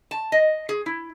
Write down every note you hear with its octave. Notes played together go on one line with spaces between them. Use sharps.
A5
D#5
G#4
E4